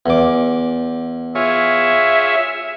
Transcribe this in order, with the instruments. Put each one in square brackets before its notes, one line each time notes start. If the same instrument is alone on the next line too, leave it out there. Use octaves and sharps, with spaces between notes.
[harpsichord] E2 D6
[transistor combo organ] F4 G#4 C#5 [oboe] E5